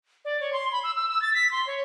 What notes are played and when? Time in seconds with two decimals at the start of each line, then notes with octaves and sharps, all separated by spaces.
0.25 D5
0.41 C#5
0.53 C6
0.72 B5
0.84 E6
0.95 E6
1.09 E6
1.22 A6
1.34 B6
1.51 C6
1.67 C#5